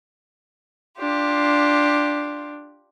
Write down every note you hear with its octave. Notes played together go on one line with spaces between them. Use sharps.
D4 F4 G4